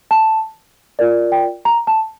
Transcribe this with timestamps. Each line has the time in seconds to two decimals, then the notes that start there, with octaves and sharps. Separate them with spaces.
0.11 A5
0.99 F4 A#4 D5
1.32 G5
1.65 A#5
1.87 A5